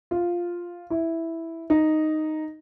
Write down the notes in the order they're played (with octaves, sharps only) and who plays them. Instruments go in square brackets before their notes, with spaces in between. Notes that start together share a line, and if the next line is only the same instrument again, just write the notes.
[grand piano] F4
E4
D#4